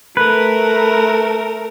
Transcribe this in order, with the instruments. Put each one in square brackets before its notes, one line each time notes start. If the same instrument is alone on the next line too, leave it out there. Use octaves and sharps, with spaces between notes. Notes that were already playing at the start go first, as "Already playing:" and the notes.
[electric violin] A3 A#4 [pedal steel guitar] B4